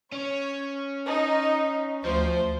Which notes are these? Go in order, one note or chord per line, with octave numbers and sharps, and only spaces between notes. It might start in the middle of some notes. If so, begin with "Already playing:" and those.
C#4 C#5
D#4
D2 F3 C5